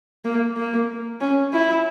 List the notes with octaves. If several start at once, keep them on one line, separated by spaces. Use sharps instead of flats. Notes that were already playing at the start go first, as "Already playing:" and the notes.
A#3
A#3
C#4
E4